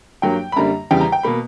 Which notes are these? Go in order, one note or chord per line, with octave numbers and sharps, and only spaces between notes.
G2 F#3 A#3 G5
B5
F#2 D3 G3 A#3 A#5
E2 C#3 G3 G5
A#5
G5
B2 A#3 B5